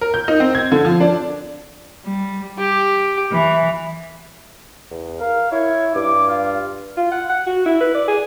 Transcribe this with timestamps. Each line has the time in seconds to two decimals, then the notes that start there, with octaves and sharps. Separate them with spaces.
0.01 A#4
0.14 G6
0.28 D#4
0.40 C4
0.55 G#6
0.72 D3
0.85 F3
1.00 D4
2.04 G3
2.58 G4
3.32 E3
4.91 E2
5.21 A#4 F5
5.52 E4 C#5
5.95 G2 D6
6.28 F4
6.97 F4
7.12 F#5
7.29 F#5
7.47 F#4
7.66 E4
7.81 B4
7.95 D5
8.08 G#4